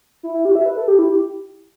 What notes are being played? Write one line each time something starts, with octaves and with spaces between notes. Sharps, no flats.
E4
E4
G4
E5
B4
A4
G4
E4
G4